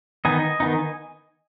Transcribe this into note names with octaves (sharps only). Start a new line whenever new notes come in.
D#3 B3 D#4 D#5 G#5
D#3 B3 D#4